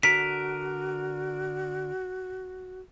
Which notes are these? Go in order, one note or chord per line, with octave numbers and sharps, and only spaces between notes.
D3 F#4 A#4 B6